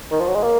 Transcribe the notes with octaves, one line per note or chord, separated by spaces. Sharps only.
D#3
F3
F#3
G#3
A#3